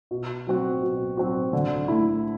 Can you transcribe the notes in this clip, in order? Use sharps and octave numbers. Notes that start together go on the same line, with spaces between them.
B2
F#3 C4 F#4
B2
F#3 C4 F#4
D3
A3 E4